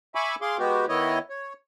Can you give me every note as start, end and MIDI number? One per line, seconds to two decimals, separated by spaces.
0.15 0.35 76
0.15 0.35 80
0.15 0.35 83
0.15 0.35 85
0.15 0.35 86
0.42 0.57 68
0.42 0.57 77
0.42 0.57 84
0.42 0.57 86
0.59 0.86 56
0.59 0.86 59
0.59 0.86 66
0.59 0.86 67
0.89 1.19 51
0.89 1.19 59
0.89 1.19 64
0.89 1.19 73
0.89 1.19 75
1.30 1.53 73